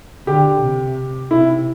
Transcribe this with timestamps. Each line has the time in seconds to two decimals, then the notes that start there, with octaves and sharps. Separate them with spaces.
0.27 D3 G4
0.62 C3
1.31 C3 E4